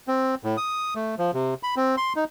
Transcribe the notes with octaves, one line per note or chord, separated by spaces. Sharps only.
C4
A2
D#6
A3
F3
C3
B5
C4
C6
D#4